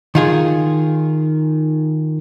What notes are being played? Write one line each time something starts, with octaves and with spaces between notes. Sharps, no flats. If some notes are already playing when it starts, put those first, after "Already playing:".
D#3 F4 G#4